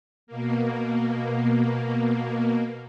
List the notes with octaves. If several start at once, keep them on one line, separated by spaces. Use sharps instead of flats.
B2 A#3